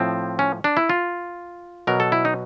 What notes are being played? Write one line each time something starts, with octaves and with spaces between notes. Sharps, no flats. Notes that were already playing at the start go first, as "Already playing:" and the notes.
Already playing: A2 F3 C4
C#4
D4
E4
F4
B2 F#3 A#4
A4
E4
D#4